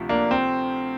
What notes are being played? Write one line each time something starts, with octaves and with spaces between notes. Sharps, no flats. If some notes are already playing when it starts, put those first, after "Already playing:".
Already playing: D2 C3 F3
A#3 D4
C4